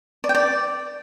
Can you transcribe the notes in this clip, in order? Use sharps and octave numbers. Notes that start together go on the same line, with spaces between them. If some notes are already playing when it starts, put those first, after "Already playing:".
D5
G5
D5